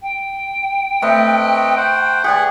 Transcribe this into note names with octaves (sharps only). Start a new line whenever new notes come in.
G5
A3 C4 B4 D#5
C5 F#5
G4 G#4 D5 F#5